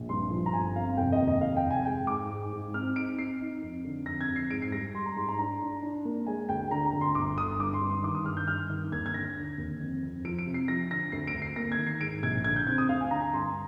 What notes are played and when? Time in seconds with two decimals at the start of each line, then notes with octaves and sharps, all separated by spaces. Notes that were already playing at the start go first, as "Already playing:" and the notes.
Already playing: A#1
0.09 G2 C6
0.31 F3
0.46 A#5
0.53 G1 G#5
0.75 C4 F5
0.97 F1 G5
1.12 D#5
1.19 D#2
1.28 D#5
1.41 F1 F5
1.57 G5
1.64 F1
1.71 G#5
1.85 G#3 G5
2.07 G#2 D6
2.30 G#2
2.52 G#2
2.74 C4 F6
2.96 D#4 D7
3.18 C4 C7
3.41 D#4
3.62 F2
3.85 D3
4.06 F2 A#6
4.21 G#6
4.28 F2
4.36 C7
4.50 G#2 D7
4.62 C7
4.72 G3 A#6
4.94 G3 C6
5.06 A#5
5.16 G#2 C6
5.28 A#5
5.39 D4 A#5
5.62 D4
5.82 D4
6.05 A#3
6.27 G#3 G#5
6.49 D2 G5
6.71 D3 A#5
6.86 A#5
6.93 D2
7.01 C6
7.15 G1 D6
7.38 D3 D#6
7.59 G2 D6
7.74 C6
7.81 G2
7.89 C6
8.03 D#3 D6
8.15 D#6
8.25 G2 F6
8.37 G6
8.48 G2 F6
8.70 D#3
8.92 D#2 G#6
9.06 G#6
9.14 D3 A#6
9.36 D3
9.58 D#2
9.80 F2
10.02 F2
10.25 F3 D7
10.39 D7
10.47 C3
10.54 C7
10.68 F3 A#6
10.91 D3 A#6
11.12 D2 C7
11.27 D7
11.34 D2
11.42 C7
11.56 A#3 A#6
11.72 G#6
11.78 D#3
11.87 C7
12.01 G#2 D7
12.23 A#1 G#6
12.44 D3 G#6
12.56 G6
12.67 C4 G#6
12.78 D#6
12.89 D2 F5
13.01 G#5
13.11 D3 A#5
13.22 A#5
13.33 G2 C6